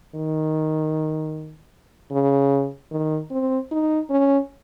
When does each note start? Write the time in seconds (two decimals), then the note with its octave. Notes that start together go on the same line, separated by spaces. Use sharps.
0.15 D#3
2.12 C#3
2.91 D#3
3.31 C4
3.72 D#4
4.10 C#4